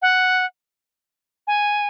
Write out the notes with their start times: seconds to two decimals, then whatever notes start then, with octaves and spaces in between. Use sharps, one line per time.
0.02 F#5
1.47 G#5